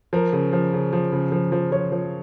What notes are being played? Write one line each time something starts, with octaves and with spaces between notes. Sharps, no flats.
F3 A#4
C#3
F3
C#3
F3
C#3
F3
F3
F3 C#5
F3